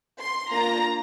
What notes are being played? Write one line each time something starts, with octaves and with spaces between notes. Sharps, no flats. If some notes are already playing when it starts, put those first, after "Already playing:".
C6
A#3 D4 F4 A#5